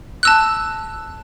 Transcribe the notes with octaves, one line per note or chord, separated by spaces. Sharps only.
A5 E6 F#6